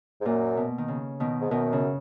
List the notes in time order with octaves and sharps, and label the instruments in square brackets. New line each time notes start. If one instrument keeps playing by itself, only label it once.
[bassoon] G#2
[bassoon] F#2 [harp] A#2
[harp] B2
D#3
C#3
B2 D#3
[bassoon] G#2
[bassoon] F#2 [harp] B2 D#3
[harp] C#3